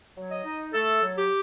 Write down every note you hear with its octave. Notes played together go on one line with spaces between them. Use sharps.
F#3
D#5
D#4
A3 A4
F#3
G4